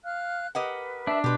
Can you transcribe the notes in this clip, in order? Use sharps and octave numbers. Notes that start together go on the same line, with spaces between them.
F5 F6 F#6
G4 A#4 B4 D#5 F#5
D4 E5
B2 G4 B4 D#5 C6 G6